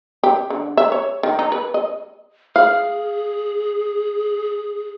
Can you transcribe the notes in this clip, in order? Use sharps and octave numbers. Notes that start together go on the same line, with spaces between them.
G4
D3
E5
C#5
D#3
D#4
B4
D#5
G#4 F5